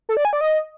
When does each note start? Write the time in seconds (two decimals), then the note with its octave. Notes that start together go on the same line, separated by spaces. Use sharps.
0.09 A4
0.17 D5
0.25 G#5
0.33 D5
0.41 D#5